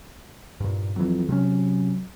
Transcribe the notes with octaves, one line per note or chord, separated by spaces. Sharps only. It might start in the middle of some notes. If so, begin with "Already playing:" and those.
G2 A#2
F2 E3 F#3
C3 F#3 A3 C#4